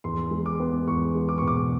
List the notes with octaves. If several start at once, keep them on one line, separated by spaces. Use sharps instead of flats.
E2 C6
G#3
D6
B3
E2 C#6
G#3
D6
B2 C#6
D6